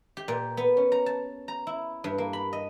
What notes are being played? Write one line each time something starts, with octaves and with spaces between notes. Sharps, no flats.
G4
A#2
B3
C#4
A#5
A5
A#5
E4
G2
A#3
B5
D#5